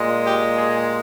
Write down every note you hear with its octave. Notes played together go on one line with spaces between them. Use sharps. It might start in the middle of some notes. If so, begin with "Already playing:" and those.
Already playing: A#2 G#3
G4
G#4